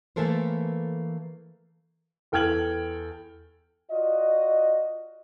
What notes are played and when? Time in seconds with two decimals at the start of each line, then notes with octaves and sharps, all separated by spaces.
0.16 E3 A3 A#3 A4 A#4 C5
2.32 E2 A4 G5 F6 G#6 F#7
3.91 F4 F#4 D5 D#5